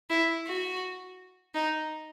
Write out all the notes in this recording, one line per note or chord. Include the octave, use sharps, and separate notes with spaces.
E4
F#4
D#4